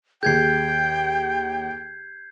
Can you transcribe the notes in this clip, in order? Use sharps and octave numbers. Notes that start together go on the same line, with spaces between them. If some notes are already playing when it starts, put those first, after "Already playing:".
D#2 G#4 G5 G6 G#6 C7